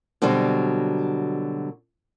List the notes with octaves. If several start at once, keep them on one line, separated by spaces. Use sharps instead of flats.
B2 D3 F#3 G3 C4